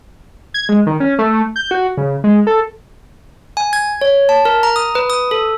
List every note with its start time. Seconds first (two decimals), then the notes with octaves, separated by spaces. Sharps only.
0.54 G#6
0.69 G#3
0.87 D#3
1.00 C#4
1.19 A3
1.56 G6
1.71 F#4
1.97 C#3
2.24 G#3
2.47 A4
3.57 G#5
3.73 G#6
4.01 C#5
4.29 A5
4.45 A#4
4.63 A#5
4.76 D#6
4.95 B4
5.10 D#6
5.31 A4